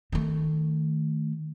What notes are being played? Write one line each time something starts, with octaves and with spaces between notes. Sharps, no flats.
D#3 A3